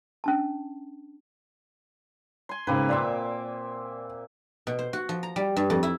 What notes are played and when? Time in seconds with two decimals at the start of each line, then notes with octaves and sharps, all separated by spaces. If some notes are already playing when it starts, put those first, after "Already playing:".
0.24 C#4 D4 A5
2.49 G#5 C6
2.67 G#2 C#3 A#3 C4 B4
2.89 A#2 D5 E5 C6 D6
4.67 B2
4.79 C5
4.93 F#4
5.09 F3
5.23 A#5
5.36 G3
5.56 G2
5.70 F2
5.83 E4